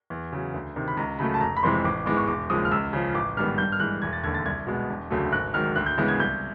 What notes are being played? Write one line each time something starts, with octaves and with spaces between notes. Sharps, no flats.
E2
C#3 F#3
D2
C3 D#3
B5
C#2 A#5
C#3 F#3 A3 B5
A5
F1 A#5
B5
F2 C3 E3 G#3 C6
A1 D6
G#2 E3 G#3 B3 D6
C#6
E1 D6
D#2 C#3 F3 G#3 D#6
F6
C#2 E6
C#3 F3
A1 D6
G#2 D#3 G3 B3 F6
G2 G6
F6
E3 G#3 F#6
E1 G#6
A6
D#2 D3 G#6
A6
C2 G#6
B2 G#3 B3
E1
D2 C#3 F#3 A3
G#1 F#6
G#2 D#3 F#3 F6
D2 F#6
G6
C#3 E3 G#3 B3
G#6
C2 G6